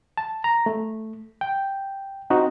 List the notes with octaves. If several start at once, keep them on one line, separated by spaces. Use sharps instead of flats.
A5
A#5
A3
G5
C4 D#4 F#4